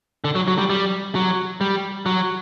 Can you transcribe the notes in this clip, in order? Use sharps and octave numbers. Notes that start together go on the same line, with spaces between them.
D3
F#3
F#3
G3
G3
F#3
G3
F#3